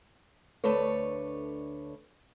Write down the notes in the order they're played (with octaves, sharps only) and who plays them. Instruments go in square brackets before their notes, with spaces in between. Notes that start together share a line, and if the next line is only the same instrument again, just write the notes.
[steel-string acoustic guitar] D2 A3 D4 B4 C#5